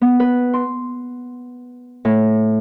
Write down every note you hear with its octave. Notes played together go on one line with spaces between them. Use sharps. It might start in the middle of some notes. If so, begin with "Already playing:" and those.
B3
B4
C6
A2